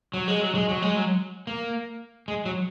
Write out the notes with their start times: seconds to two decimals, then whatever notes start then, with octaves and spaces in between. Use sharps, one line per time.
0.14 F#3
0.28 G#3
0.41 F#3
0.55 G#3
0.69 F#3
0.82 G#3
0.96 F#3
1.47 A#3
2.28 G#3
2.46 F#3